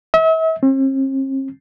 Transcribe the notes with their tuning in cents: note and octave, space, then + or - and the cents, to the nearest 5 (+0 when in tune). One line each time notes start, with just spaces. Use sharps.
E5 -40
C4 +45